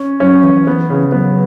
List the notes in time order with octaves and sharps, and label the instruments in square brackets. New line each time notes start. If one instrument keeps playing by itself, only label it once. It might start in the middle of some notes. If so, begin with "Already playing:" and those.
Already playing: [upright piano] C#4
[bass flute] F#3 [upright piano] C#4
[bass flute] E3
[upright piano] B3
C#3
[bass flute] F#3 [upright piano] B3